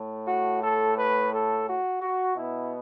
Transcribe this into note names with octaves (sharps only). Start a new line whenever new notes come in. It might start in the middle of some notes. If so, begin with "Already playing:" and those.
Already playing: A2 A3
F#4
A4
B4
A4
F#4
F#4
B2 B3 E4